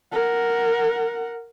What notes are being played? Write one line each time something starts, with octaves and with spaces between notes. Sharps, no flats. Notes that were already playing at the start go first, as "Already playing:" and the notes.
A#4 F#5